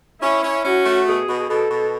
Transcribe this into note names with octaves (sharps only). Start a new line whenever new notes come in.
C#4 E4
C#4
C#4 F#4
A3
B2 G#4
B2
B2 A4
B2